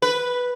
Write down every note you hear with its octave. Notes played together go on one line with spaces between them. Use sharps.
B4